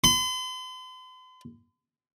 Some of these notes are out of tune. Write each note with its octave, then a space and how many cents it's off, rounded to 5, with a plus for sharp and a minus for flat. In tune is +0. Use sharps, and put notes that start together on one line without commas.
C6 -45